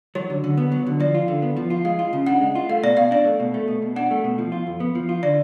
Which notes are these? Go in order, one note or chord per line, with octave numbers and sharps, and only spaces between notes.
F#3 C#5
D3
D3
B3
F#3
D3
F3 D5
F4
D3
B3
F3
F4
G#3 F5
F4
C#3
D4 F#5
G#3
F4
A3 F5
B2 D5
B2 F5
D4 D5
A3
B2
A3
B2
B2
D4 F#5
A3
B2
F3
F4
F2
B3
F3
F4
D3 D5